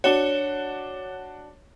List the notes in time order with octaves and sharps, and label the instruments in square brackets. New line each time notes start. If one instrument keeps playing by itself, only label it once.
[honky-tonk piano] D4 F#4 [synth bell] C#5 E7 G7